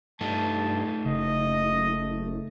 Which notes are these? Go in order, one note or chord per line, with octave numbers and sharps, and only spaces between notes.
G2 A3 D#4 A5
F#1 C#3 D#5